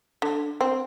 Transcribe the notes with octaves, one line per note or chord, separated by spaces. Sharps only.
D3
C4